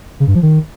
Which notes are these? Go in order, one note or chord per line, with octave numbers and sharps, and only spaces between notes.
C#3
G2
F3
D#3